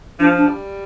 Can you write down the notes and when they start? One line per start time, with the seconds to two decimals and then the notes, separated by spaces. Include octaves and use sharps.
0.19 F3 D4
0.38 D4
0.48 G3